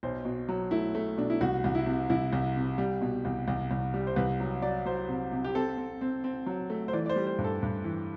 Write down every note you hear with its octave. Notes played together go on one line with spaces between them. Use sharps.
B1 C5
B2
F#3
A3 E4
A3
B2 D4
E4
C2 F#4
C2
E4
C3
C2 E4
C2
C3
G3
B2
C2
C2
C2
G3
C5
C2 B4
F#3
F#3 D5
F#3 C5
C3
C3
G4
C4 A4
C4
C4
C4
F#3
A3
C5
E3 D5
D5
C5
G3
C5
G2
A4
G2
E3